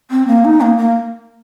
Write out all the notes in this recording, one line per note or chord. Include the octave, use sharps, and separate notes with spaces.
C4
A#3
D#4
A#3
A#3